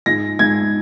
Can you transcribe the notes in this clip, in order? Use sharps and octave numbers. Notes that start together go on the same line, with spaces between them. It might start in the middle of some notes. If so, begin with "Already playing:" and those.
G#2 G#3 F4 A#6
G#2 G#3 F4 G#6